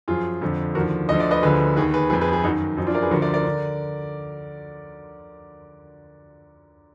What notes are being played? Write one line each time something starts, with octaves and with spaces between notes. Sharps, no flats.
F#2 F3 F4 G#4
F2 D3 F3
D#2 D3 F3 F#4 A#4
D2 D3 F3 D#5
D5
B4 D#5
D2 D3 F3 G#4 B4
D#2 D#3 G#4 B4
G#4 B4
F2 F3 G#4 B4
G#4 B4
G#4 B4
F#2 D#3 D#4 F#4
F#2 F3 D#4
D4 F4
A#4 D5
G#4 B4
D2 D3 F3 F#4 A#4
A#4 D5
A#4 D5
D3